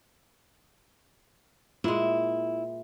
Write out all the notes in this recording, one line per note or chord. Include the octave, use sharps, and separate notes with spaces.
A#2 G#3 E4